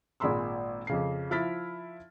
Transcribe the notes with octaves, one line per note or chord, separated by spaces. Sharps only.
G#1 A#2 G#3 B5 C6 E6
F2 C#3 C7
F3 E4 F6 A6 B6